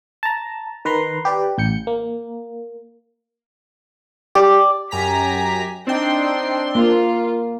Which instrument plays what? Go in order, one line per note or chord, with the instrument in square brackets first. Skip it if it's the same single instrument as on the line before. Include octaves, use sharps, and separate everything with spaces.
[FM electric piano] A5 A#5
D#3 B4 A#5 C6
G4 B4 D5
A1 G6 C#7
A#3
[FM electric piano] G4 [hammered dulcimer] D5
[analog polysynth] F#2 A#5 B6 [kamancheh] G4 G#5
[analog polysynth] C4 D4 C6 [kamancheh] D#4 G5
[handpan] A#3 [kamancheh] F4